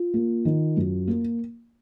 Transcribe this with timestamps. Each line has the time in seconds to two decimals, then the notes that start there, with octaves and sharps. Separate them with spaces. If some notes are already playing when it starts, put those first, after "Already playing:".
Already playing: F4
0.14 A#3
0.45 D#3
0.77 F#2
1.07 A#3